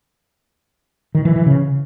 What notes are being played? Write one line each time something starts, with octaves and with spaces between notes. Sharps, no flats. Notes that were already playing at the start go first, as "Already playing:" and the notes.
D#3
E3
E3
C#3